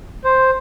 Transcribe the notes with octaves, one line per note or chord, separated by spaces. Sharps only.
C5